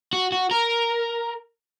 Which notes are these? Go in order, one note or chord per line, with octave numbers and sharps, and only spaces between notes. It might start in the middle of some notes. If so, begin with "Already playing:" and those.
F#4
F#4
A#4